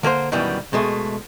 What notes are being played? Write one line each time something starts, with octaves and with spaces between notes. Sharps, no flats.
D3 A#3 A#4 C5
F#2 B2 D#3 E3 G3
B2 G#3 A3